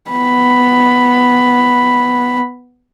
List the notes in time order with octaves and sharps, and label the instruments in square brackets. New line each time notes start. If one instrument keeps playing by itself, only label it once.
[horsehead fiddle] B3 B5